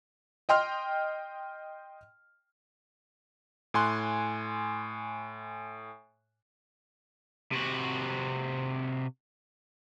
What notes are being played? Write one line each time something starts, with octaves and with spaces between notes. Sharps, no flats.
D#5 G5 C6 F6
A2 G#5 C6 F#6
C3 F#4